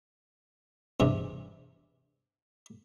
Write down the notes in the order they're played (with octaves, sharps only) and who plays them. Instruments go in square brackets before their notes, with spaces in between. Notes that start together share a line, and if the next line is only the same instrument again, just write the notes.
[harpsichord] E2 G2 C3